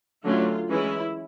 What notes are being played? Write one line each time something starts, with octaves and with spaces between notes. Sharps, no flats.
D3 F#3 A3 C#4 F4
E3 G#3 C#4 E4